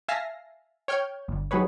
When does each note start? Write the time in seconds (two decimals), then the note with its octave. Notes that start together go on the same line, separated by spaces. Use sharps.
0.08 E5 F5 G#5 A5 A#6 C7
0.88 C#5 G5 F6 G6 G#6
1.28 G1 G2
1.51 D#3 F#3 G3 G#4 B4 C#5